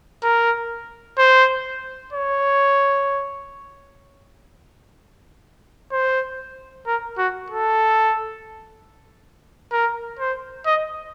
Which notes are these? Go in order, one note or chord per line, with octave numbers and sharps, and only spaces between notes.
A#4
C5
C#5
C5
A#4
F#4
A4
A#4
C5
D#5